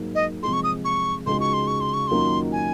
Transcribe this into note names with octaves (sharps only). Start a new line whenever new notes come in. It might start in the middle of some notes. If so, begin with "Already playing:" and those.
Already playing: G#2 F#3 A#3
D#5
C3 F3 G#3 C6
C#6
D#6
C#6
C#2 C#3 G#3 D#4 F#4 C6
C#6
C6
C#6
C6
C#6
F#2 D#3 F#3 A#3 F4 C6
G#5